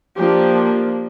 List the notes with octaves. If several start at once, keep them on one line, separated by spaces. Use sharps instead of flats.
F3 A#3 D4 G4